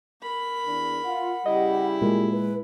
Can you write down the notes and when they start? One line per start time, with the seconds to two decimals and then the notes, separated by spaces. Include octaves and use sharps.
0.22 A#4 B5
0.65 E2 D4
1.05 F4 F#5
1.46 C#3 G3 E4 G4 D#5
2.01 A#2 G#3 A#4
2.31 B4